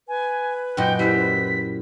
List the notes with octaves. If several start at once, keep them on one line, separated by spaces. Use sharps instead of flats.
B4 G#5
F#2 A#2 C#4 D#4 F#4 G5
G3 E4 C5 B6